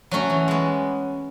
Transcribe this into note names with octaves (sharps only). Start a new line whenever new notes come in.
F#3 A3 C#4 F#4
E3
G#3 B3